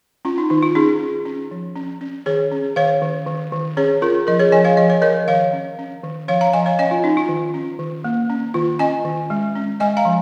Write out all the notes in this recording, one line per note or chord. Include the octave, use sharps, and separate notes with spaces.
C#4 F4
D#4
D#3 D#4
F4
C#4 D#4 G#4
C#4
C#4
F3
C#4
C#4
D#3 G#4 C#5
C#4
D#3 C#5 F5
D#3
D#3
D#3
C#4 G#4 C#5
C#4 F4 A#4
F3 A#4 D#5
G#4 C#5
F3 D#5 G#5
C#5 F5
F3 D#5
C#5
F3 A#4 D#5
D#3 C#5 F5
C#4
C#4
D#3
F3 C#5 F5
F5 A#5
F3 D#5 G#5
C#5 F5
C#4 D#5 G#5
F4
C#4 D#4
F4
D#3
C#4
D#3
A#3
C#4
D#3 F4
C#4 D#5 G#5
D#3
G#3
C#4
G#3 D#5 G#5
F5 A#5
F3